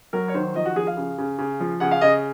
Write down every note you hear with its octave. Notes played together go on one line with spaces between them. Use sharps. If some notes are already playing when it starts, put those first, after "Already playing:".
F#3 A#4
C#5
D#3 C5
F3 D#5
F#4
F3 G#4
F5
C#3
C#3
C#3
F3
C#3 F#5
F5
C#3 D#5